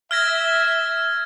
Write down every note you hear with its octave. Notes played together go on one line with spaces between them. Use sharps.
E5 F6 G#6 A#6